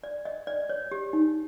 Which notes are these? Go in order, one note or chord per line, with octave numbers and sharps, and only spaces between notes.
D5
D#5
D5
C#5
G4
D#4